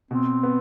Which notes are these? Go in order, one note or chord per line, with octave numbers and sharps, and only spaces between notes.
B2 C4
B3